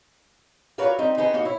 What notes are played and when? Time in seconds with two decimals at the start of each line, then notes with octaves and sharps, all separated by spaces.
0.78 F4 F#4 A#4 B4 C#5 D5
0.99 G3 C4 D#4
1.17 B3 C4 D#4 G#4
1.34 A#3 D#4 F#4
1.45 E4 C#5